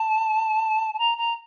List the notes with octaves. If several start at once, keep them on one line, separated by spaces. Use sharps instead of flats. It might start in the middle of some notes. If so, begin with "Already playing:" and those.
Already playing: A5
A5
A#5
A#5